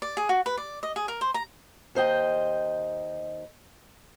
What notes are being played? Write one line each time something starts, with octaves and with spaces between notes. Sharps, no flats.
D5
G#4
F#4
B4
D5
D#5
G#4
A#4
C5
A#5
D#2 C5 D#5 G5